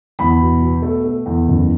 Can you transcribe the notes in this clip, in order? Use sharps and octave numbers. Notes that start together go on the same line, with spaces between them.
E2 B5
B2
B2
A3
A3
E2
F#1